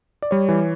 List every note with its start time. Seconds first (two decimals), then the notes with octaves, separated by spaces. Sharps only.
0.22 D5
0.31 G3 C#5
0.49 E3